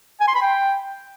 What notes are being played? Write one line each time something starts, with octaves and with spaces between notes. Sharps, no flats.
G#5
C6
B5
G5